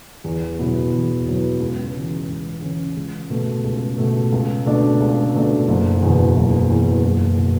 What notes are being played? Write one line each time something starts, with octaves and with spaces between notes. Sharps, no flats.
E2
B2 F#3 B3 E4
E2
B2 F#3 B3 E4
C#2
C#3 E3
C#2
C#3 E3
C#2
B2 A3
C#2
B2 A3
C#2
B2 A3 D4
C#2
B2 A3 D4
F#1
E2 B2
F#1
E2 B2
F#1
B2